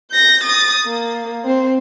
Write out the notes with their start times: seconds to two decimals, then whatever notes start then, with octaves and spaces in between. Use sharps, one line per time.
0.11 G6 A#6
0.43 D#6 A6
0.85 A#3
1.44 C4 C5